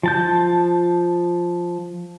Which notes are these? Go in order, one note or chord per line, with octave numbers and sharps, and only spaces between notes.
F3 A5 G6